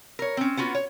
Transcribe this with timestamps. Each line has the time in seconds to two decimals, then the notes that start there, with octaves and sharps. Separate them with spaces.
0.19 A#4 C#5
0.37 C4 C#4
0.57 B3 C#4 F4 F#4
0.75 C#5